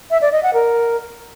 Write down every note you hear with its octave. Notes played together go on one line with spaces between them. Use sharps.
E5
D5
D#5
F#5
A#4